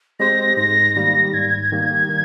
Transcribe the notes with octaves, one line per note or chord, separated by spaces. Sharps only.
G#3 C4 G4 C5 A#6
G#2 A#6
D#3 G3 A#3 A#6
G#2 G#6
D#3 G3 A#3
D#3